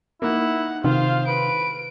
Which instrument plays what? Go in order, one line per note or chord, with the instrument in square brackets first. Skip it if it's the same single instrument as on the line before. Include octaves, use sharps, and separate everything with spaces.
[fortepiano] A#3 [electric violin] D#4 F#5 [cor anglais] E4
[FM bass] C3 [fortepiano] D#3 [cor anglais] F4 [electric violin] C5 F5
[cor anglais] B4 [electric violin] D7